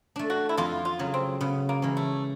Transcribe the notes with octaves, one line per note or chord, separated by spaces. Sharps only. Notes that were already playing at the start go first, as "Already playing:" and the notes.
A3 D4
F#4
E4
F2 F4
F4
C#3 F#3
C4
C#3 B3
A#3
E3 G#3 C#4
A3